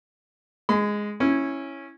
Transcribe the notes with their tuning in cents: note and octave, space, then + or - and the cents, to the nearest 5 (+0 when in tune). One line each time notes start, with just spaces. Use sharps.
G#3 +0 C6 -45
C#4 -10 E4 +0